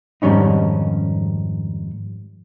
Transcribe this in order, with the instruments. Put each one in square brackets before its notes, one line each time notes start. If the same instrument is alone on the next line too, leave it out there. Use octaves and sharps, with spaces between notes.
[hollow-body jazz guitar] F2 G#2 D#3 G3 C#4 D#4